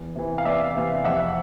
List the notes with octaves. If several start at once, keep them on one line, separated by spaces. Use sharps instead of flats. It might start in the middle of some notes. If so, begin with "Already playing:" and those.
Already playing: E2
C3 E3
F5
E2 D5 E5
C3 E3
F2 E5 F#5